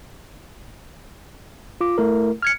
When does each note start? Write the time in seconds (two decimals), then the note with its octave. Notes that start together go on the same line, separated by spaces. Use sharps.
1.81 F4 D6
1.98 A3 E4 A#4
2.43 F6 G#6 C#7